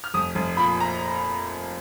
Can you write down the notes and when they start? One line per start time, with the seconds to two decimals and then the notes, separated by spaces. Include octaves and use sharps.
0.04 F6
0.14 F1 D#6
0.35 F1
0.57 A#2 B5
0.80 A#5